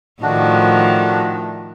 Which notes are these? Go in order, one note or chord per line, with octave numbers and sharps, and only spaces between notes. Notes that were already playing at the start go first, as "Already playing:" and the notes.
A2 D#3 F3 A3 D4 F#4